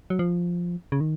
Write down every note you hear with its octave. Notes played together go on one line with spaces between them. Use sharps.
F#3
F3
C#3
D#3